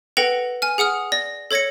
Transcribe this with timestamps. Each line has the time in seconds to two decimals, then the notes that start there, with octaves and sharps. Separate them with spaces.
0.17 A4 B4 F#5 G5 A#6 F7
0.62 G#5 F6
0.78 G#4 F#5 D#6 F6
1.12 D5 A#6
1.51 A4 C#5 G#6 A#6 C#7